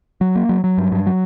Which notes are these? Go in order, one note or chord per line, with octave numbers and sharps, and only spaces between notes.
F#3
A#3
F#3
F#3
G2
G2
F#3